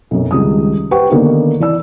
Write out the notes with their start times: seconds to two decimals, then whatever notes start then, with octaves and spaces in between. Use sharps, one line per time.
0.11 B1 F#2
0.31 C#2 D#3 G3 D#6
0.91 G4 B4 C5 F#5 G5 C#6
1.10 D3 D#3 A#3 B3 D#4 A#4
1.60 E3 D5 E6